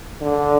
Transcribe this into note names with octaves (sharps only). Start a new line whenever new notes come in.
D3